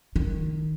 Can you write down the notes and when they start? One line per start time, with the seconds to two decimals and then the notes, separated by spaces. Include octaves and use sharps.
0.16 D#3